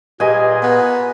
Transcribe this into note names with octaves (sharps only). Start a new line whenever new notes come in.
A#2 G4 G#4 A#4 B4 D#5 G#5
B3